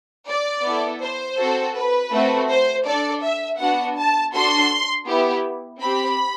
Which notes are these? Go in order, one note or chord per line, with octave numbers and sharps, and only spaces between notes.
D5
B3 E4 A4
C5
C4 F#4 A4
B4
A3 C4 F#4
C5
D4 A4 D5
E5
B3 D4 F#4 F#5
A5
D4 F#4 A4 C6
B3 E4 G4
C4 G4 B5